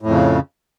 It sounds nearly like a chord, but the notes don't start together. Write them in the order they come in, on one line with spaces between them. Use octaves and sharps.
A2 F2 C#3